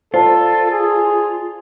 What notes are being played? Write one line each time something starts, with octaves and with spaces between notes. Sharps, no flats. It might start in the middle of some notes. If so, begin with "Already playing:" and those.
F4 A4 C5 D5 A5
G#4